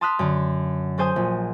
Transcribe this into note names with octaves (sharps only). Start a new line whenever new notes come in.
A5 C6 D#6 F6 F#6 B6
F#2 D3
F#3 A4 C5 G#5 D#6 G6
A#1